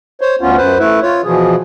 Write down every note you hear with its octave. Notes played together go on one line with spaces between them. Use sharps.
C5 C#5
D2 B3 C#4 F4
F#2 B4 C5
A3 E4 B4
F4 C#5
B2 E3 F3 G#4